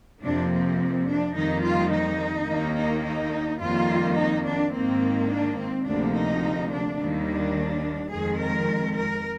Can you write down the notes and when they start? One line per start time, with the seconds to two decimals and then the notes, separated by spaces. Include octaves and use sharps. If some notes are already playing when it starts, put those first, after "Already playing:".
0.23 F2 C3 F3 A#3 D4
0.51 C4
1.08 D4
1.36 F2 D#3 G3 A#3 D#4
1.64 F4
1.92 D#4
2.49 D#2 D#3 A#3
2.76 D#4
3.05 D#4
3.60 F2 D#3 G3 A#3 F4
4.16 D#4
4.45 D4
4.73 G#2 D#3 A#3 C4
5.30 D4
5.58 C4
5.86 D2 C3 F3 A#3 D4
6.14 D#4
6.71 D4
6.98 D#2 D#3 G3 A#3
7.26 D4
8.10 F2 D#3 G#3 G#4
8.39 A#4
8.95 A#4